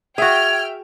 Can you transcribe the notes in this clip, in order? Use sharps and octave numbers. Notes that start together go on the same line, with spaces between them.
F#4 G#4 E5 G5 F6 G#6